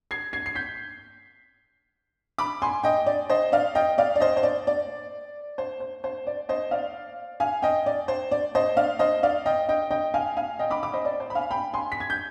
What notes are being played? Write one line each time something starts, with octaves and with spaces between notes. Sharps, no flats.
G#6 C7
G#6 C7
C7
G6 B6
B5 D6
G#5 C6
D#5 G5
D5
C5 D#5
D5 F5
D#5 G5
D5 F5
D5
C5 D#5
C5
D5
D5
C5
C5
C5
D5
C5 D#5
D5 F5
F5 G#5
D#5 G5
D5
C5
D5
C5 D#5
D5 F5
C5 D#5
D5 F5
D#5 G5
D#5 G5
D#5 G5
F5 G#5
F5 G#5
D#5 G5
B5 D6
B5 D6
C5 D#5
D5
C5
B5
F5 G#5
G5 B5
G#5 C6
B6
G#6
G6